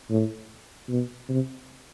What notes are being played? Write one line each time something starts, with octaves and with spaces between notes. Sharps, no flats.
A2
B2
C3